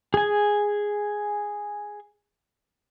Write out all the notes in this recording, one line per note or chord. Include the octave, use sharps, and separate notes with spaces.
G#4 G#5